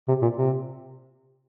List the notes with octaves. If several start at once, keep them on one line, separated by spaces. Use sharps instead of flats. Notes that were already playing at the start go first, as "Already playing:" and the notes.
C3
A#2
C3